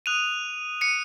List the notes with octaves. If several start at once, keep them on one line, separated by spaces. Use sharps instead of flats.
D#6 F#6 D#7 F7
C#7 D#7